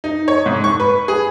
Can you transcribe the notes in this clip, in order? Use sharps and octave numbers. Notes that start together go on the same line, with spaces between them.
D#4
C#5
G#2
C#6
B4
G#4